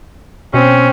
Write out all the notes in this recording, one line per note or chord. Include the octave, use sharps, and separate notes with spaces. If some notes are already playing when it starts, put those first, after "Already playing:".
B2 C4 C#4